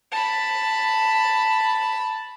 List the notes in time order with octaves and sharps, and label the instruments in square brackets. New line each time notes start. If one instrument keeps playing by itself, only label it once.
[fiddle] A5 B5